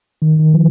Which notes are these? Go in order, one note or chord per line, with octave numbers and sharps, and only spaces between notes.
D#3
D#3
F3